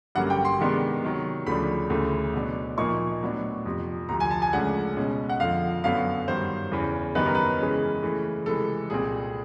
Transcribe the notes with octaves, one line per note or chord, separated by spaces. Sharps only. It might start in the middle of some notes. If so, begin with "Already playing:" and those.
G2 D3 F#3 A#3 C#4 F#5
G5
C6
C3 D#3 G#3 B3 D4
C3 D#3 F#3
D2 C#3 F3 A3 D4 B5
D2 C#3 E3 A3
B2 F#3 B3 D4
A#2 F3 A#3 D#4 C#6
A2 F#3 B3 D4
F2 C3 F3
D2 C3 F3 A#5
G#5
A5
G#5
C#2 C#3 F3 A3 D4 F#5
B2 G#3 C#4
F#5
F2 D3 F3 F5
F#2 D3 F#3 B3 F5
G2 D#3 F#3 C5
E2 C#3 E3
F#2 D#3 G3 B3 D#4 B4
A#4
B4
C#3 E3 G#3 C#4
C#3 E3 A3
C3 E3 G#3 A4
C2 A#2 G3 C4 G#4